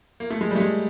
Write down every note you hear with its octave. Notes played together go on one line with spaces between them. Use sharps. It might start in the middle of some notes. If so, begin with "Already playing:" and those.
A#3
A3
G#3
G3
A3
G#3